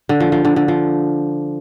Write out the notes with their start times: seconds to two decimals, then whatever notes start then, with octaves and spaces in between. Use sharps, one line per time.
0.09 D3
0.20 F3
0.32 F3
0.45 D3
0.56 D3
0.68 F3